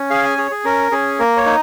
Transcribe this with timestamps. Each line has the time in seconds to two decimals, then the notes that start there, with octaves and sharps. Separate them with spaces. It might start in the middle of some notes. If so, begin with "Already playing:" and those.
Already playing: C#4
0.10 G#4 F5
0.24 G#5
0.37 G#4 C#5
0.51 G#4
0.64 C#4 A#4
0.92 C#4 G#4
1.19 A#3 A#4
1.37 C#5
1.46 D#4